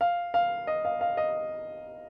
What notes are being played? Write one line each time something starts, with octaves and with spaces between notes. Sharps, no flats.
F5
F5
D#5
F5
F5
D#5